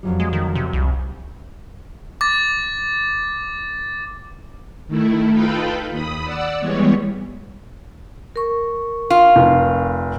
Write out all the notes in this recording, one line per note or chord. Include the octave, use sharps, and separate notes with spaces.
F2 F#3 G3
G#3
D#3
C3
C2
D6 A6
D#3 A3 E4
D#4 F4 A4 B4 G5 B5
D#2 B5 D#6
D5 F#5 E6
E3 G3 G#3 B3 C#5
A#4 C#6
F4
F1